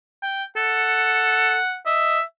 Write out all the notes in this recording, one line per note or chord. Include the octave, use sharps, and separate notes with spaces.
G5
A4 F#5
D#5 E5